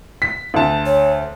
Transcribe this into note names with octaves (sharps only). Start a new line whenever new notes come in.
B6
D2 A5
C#5